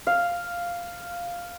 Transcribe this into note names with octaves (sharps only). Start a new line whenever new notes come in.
F5